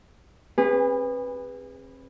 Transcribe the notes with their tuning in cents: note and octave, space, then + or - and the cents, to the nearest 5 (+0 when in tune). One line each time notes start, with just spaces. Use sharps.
C4 +45 G#4 -35 B4 +0